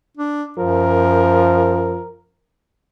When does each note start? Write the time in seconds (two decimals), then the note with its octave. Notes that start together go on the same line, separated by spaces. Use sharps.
0.17 D4
0.58 F#2 F3 A#4